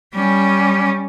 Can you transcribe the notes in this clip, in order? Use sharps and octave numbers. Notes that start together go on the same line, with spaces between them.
G3 C#4